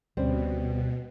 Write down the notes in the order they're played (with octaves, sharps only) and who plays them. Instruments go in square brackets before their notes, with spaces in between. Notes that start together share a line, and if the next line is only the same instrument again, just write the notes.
[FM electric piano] D2 C#4 [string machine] B2 [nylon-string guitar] G3 C4